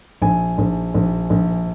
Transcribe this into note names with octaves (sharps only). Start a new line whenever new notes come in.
A#1 G#5
A#1
A#1
A#1